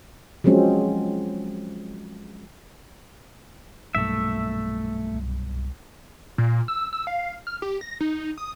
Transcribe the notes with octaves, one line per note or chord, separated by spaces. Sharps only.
F3 F#3 G#3 C4 C#4
B1 G2 A#2 A3 E5
C2
A#2
E6
E6
F5
F6
G4
A#6
D#4
D#6